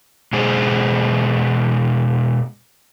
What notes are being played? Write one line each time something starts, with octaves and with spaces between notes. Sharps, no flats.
B2 G#3 G#4 C5